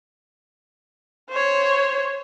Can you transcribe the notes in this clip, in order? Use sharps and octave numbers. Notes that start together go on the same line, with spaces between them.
C5 C#5